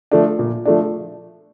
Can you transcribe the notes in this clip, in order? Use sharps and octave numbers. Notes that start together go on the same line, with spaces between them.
F3 A3 D4
A#2
F3 A3 D4